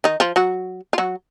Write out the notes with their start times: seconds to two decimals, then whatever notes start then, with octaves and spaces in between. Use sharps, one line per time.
0.04 D#3 D#4
0.20 F3 F4
0.36 F#3 F#4
0.93 F4
0.98 F#3 F#4